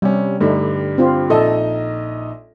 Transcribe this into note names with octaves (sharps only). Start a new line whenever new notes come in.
C3 G3 C#4
G2 D3 G3 A3 D#4
C4 F4
A#1 D#4 A4 D#5